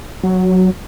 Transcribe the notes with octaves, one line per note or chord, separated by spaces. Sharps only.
F#3